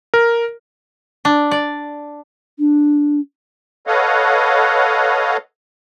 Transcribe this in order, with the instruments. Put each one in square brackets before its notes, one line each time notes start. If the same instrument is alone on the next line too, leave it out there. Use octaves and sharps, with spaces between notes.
[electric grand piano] A#4
[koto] D4
D5
[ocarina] D4
[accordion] A4 B4 C#5 D#5 F5 F#5